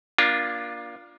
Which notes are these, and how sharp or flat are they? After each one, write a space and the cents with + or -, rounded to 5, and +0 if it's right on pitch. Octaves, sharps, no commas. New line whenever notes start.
A#3 +30 D4 +0 F4 +0